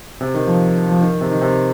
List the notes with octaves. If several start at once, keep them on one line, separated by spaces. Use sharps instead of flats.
C3
D#3
F3
F3
D#3
C3
D#3
C3